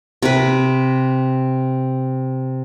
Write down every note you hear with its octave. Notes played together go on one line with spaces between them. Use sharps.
C3 B4